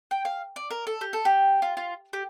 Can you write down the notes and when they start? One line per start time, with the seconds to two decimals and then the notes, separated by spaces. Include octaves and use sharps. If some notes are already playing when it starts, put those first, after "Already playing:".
0.11 G5
0.25 F5
0.56 D5
0.71 A#4
0.87 A4
1.01 G4
1.13 A4
1.25 G4
1.62 F4
1.77 F4
2.13 G4